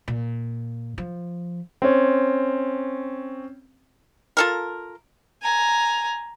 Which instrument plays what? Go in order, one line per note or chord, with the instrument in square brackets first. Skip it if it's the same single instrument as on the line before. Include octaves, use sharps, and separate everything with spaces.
[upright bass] A#2
F3
[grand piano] C4 C#4
[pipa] F4 A4 A#4
[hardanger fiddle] G#5 A#5